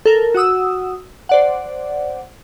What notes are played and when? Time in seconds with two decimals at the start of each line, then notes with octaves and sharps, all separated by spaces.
0.06 A4 A#4
0.34 F#4 F#5 D#6 E6
1.29 C5 D5 F#5